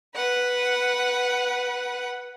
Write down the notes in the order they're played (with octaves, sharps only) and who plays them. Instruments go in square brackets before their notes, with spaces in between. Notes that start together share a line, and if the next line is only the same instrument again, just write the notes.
[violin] B4 F#5